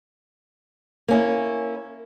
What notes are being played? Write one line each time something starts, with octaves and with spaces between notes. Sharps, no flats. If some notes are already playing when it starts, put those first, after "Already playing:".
A#3 C#4 E4